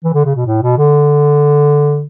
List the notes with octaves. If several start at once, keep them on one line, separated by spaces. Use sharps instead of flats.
E3
D3
C#3
B2
A2
B2
D3